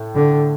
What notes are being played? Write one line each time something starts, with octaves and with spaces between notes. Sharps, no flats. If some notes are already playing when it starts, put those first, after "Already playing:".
Already playing: A2
D3